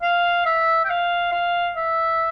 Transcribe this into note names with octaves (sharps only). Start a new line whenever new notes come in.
F5
E5
G5
F5
F5
E5